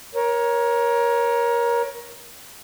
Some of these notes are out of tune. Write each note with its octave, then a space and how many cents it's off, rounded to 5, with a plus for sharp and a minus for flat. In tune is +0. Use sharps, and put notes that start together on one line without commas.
A#4 +25 C#5 +0